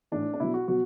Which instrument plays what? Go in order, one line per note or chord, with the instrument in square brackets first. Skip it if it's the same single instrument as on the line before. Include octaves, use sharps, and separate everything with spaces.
[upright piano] A2 E3 D4
D4
B2 F#3 E4
F#4
B2 F#3 F#4